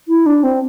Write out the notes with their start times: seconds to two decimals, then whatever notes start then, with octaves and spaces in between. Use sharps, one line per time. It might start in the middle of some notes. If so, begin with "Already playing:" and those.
0.08 E4
0.26 D4
0.43 C4